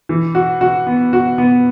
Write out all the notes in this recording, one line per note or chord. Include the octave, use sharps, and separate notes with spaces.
E3
F#4
F#4
B3
F#4
B3